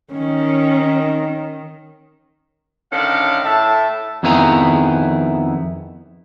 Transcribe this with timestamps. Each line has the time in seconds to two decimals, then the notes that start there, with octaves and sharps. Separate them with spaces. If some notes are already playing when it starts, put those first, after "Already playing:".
0.13 D#3 C#4
2.92 A2 D3 D#3 C#4 D4 F5
3.45 A2 E5 A5
4.23 F2 D#3 B3 E4 G#4 A#5